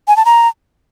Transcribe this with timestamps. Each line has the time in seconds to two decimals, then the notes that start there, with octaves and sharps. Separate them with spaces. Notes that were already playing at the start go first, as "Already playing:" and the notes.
0.08 G#5
0.17 A5
0.25 A#5